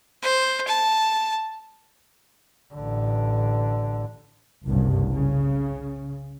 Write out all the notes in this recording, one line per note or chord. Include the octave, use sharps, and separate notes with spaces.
C5
A5
A1 D3
F#1 C2 G2
C#3